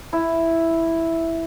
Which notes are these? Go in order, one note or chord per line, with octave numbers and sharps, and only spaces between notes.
E4